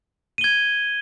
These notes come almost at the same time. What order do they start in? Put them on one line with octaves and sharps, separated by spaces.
D#7 G7 G#6